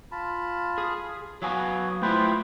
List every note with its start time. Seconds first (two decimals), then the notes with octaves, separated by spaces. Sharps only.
0.12 F4 A5 B5
0.78 G#4
1.42 F#3 B3 C#5 F5 G#5
2.02 A3 E4 F4 B4 C5 G5